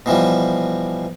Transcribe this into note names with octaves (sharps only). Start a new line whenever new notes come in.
B2 E3 F3 G3